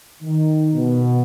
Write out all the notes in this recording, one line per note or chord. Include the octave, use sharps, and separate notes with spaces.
D#3
B2